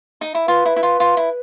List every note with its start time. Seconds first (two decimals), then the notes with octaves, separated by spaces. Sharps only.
0.21 D#4
0.35 E4
0.47 F4 B4
0.65 E4
0.76 E4
0.83 F4
1.00 F4
1.17 E4